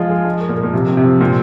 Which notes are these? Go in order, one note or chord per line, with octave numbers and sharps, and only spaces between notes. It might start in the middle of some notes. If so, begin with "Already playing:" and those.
Already playing: F3 G#3 F4
G#4
G#3
A#4
A#2
A#4
A#2
C3 F3
C4
C3
F3
A#2 C4